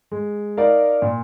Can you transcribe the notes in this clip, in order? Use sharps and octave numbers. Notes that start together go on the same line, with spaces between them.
G#3
D#4 A#4 D5 F5
A#2